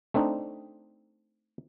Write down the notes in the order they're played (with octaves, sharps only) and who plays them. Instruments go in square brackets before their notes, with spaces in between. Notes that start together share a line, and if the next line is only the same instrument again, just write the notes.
[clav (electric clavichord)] A3 C4 D4 D#4